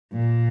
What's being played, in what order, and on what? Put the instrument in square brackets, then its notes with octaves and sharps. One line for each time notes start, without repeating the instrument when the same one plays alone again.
[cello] A#2